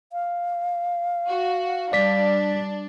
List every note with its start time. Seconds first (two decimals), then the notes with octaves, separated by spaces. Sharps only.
0.13 F5
1.28 F#4
1.93 G3 D4 D5 B6